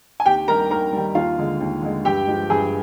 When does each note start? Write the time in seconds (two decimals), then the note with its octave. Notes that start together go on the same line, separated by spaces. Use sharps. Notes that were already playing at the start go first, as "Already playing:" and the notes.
0.20 G#5
0.26 D#2 G4 G5
0.48 D#3 G3 A#4 A#5
0.71 D#2 A#4 A#5
0.93 D#3 G3
1.15 D#2 F4 F5
1.38 D3 G#3
1.61 D#2
1.82 D3 G#3
2.05 G2 G4 G5
2.27 F3 G#3
2.50 G2 G#4 G#5